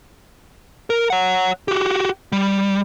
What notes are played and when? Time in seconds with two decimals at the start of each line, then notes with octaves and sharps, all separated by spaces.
0.90 A#4
1.10 C#5 F#5
1.68 F#4 G4
2.32 G3